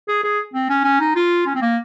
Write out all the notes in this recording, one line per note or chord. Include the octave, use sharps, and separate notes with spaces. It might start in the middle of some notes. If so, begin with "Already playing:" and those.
G#4
G#4
C4
C#4
C#4
D#4
F4
C#4
C4
A#3